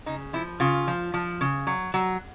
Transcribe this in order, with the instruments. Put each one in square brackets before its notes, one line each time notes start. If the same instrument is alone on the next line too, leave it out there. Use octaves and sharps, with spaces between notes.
[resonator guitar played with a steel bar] C#3 D#4
F3 E4
C#3 F4
F3
F3
C#3
F#3
F#3